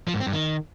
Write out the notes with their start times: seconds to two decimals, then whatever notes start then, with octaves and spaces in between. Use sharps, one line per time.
0.08 F3
0.14 G#2
0.20 C4
0.27 G2
0.33 D#3